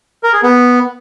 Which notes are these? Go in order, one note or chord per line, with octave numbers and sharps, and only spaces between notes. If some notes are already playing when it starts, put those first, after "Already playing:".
A#4
G#4
B3